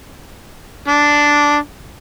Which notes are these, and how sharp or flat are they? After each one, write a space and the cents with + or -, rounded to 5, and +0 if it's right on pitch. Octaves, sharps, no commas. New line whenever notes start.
D4 -5